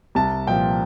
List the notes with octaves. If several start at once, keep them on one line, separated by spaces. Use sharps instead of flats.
C2 A5
A#2 F3 G5